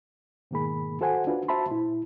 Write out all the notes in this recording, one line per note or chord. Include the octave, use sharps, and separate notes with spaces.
G#2 B2 D#3 A#3 G#4 B5
F#4 A4 C5 F#5 G#5
D4 F4 F#4 B4
F#4 C5 E5 A5 B5 C6
A#2 E4